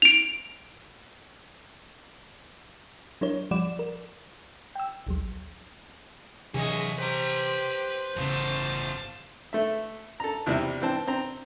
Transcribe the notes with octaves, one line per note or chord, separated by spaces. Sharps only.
D7 F7
F#3 D4 E4 A#4 C#5
F3 G3 D5 F#5 D6 E7
A#4
G5 E6
A1 D2 F#3
C3 E3 F#3 D4 G#4 C#5 D#5
G4 B4 C5 A#5
G1 E2 A2 C#3 F5 A5
A3 E5
A4 A#5
E2 C3 G3 E4
E3 C4 A5
C4 A#5